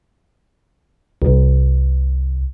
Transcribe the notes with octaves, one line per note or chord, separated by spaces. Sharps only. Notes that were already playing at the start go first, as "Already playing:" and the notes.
C2